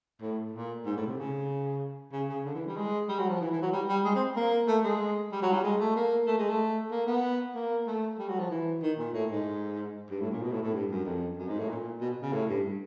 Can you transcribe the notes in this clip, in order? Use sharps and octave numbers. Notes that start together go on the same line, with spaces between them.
A2
A#2
G#2
A2
C3
C#3
C#3
C#3
D3
E3
G3
G#3
G3
F#3
F3
E3
E3
F#3
G3
G3
G#3
C4
A#3
A3
G#3
G3
F#3
G3
G#3
A3
A#3
A3
G#3
A3
A#3
B3
A#3
A3
G3
F#3
F3
E3
D#3
A#2
A2
G#2
G2
A2
A#2
B2
A2
A2
G2
F#2
F2
F#2
G#2
A2
A#2
B2
C#3
A2
G2